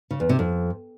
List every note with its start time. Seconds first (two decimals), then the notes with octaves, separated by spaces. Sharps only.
0.11 C#3
0.20 E2
0.29 C3
0.39 F2